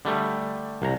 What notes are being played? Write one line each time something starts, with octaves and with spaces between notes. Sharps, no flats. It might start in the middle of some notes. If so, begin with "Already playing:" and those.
D3 G3 A3
C2 A#5